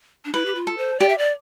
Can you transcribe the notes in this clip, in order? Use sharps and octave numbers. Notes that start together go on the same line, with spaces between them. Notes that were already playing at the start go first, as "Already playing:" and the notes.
D4
E4 B4
G4
F4
A4
C5
G4 D5
E5
D5